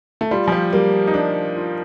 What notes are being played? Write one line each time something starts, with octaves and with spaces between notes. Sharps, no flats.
A3
G3 F4
F3
G3
G3 A#3
D#4
D4 F4
F4